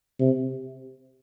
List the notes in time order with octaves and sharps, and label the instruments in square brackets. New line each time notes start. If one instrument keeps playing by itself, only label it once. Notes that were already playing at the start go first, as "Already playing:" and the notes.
[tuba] C3